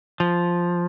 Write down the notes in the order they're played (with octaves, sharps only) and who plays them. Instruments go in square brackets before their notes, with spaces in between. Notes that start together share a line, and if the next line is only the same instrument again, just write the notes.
[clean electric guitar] F3